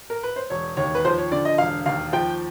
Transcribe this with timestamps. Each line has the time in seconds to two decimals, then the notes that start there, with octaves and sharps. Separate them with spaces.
0.10 A#4
0.23 B4
0.36 C5
0.50 E1 C#5
0.77 D#2 C#5
0.95 B4
1.05 F3 C5
1.18 C#5
1.32 D3 D5
1.45 D#5
1.58 E1 F5
1.86 D#2 F5
2.13 F3 G5